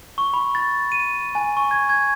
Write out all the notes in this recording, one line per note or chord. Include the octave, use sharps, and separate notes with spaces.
C#6
B5
A6
D#7
G#5
C#6
G#6
G#6